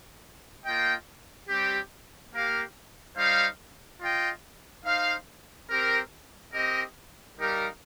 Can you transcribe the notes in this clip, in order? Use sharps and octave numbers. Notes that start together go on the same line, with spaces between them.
A#3 F4 D#5 G5
G3 C4 G4
A#3 G4 A#4 F5
G3 D#4 C5 F5
F4 D#5 G5
D#4 C5 F5
C4 G4 A#4
C4 G4 A#4 D#5
G3 D#4 G4 A#4 F5